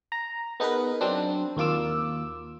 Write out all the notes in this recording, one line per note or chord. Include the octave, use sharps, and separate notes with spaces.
A#5
B3 D#4 G#4 A#4 B4
F#3 C4 D4
D#2 A#3 F4 D6 E6